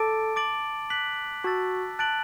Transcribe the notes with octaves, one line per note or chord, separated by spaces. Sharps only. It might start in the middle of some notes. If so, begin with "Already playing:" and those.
Already playing: A4 A5 D6 A6 D7
D6 A6 D7 F#7
F#6 B6 F#7
F#4 A5 E6 A6
A5 F#6 A6 D7 F#7